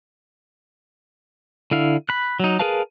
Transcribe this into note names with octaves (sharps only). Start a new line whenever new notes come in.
D3 E4 F5
B5 F#6
F#3 D#4
G#4 A#4 B4 F5 A5